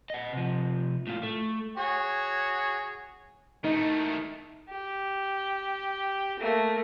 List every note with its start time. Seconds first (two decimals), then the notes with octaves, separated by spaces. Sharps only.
0.10 D#5 F#5
0.33 C3 F3
1.07 A2 F4
1.23 A3
1.77 F#4 G#4 C#5
3.64 D#3 A3 D#4
4.70 G4
6.39 A3 A#3